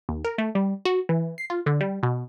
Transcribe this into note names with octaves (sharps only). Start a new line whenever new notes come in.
D#2
A#4
A3
G3
F#4
E3
C7
F4
D3
G3
B2